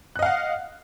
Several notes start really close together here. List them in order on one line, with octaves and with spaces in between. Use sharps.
F#6 D#5 F5 F#5